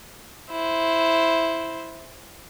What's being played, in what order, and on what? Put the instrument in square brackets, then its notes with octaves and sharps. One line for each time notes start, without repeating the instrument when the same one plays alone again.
[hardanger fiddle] E4 C5